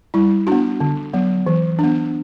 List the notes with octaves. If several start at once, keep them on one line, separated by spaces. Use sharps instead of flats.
G3 E4
B3 D4 F#4
D3
F#3 B3
E3
B3 D4